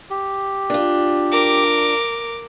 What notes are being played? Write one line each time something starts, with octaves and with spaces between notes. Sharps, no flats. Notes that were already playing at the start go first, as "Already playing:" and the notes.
G4
D4 F4
A#4 D6